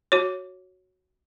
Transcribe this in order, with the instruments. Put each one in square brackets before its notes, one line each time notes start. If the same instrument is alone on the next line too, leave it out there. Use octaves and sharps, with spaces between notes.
[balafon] F#4 C#5